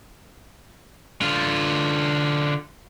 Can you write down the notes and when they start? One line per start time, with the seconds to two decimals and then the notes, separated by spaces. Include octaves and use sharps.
1.22 D3 F4